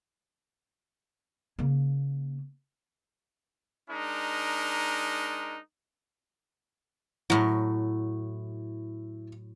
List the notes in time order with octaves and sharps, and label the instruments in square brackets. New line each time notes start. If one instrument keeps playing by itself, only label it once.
[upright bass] C#3 A#3
[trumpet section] G#3 D4 D#4 A#4
[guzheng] A2 F#3 [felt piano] E4